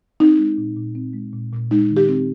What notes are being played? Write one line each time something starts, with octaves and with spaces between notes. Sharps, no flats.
C4 D#4
G#3
A#2
A#2
C4
G#3
A#2
A#2
G#3 D#4
D#3
G4
C4